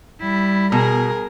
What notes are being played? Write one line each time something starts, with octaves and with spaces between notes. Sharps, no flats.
G3 E4
B2 G#4 A#4